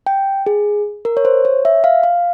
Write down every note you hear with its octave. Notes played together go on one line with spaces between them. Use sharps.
G5
G#4
A#4
C#5
C5
C#5
E5
F5
F5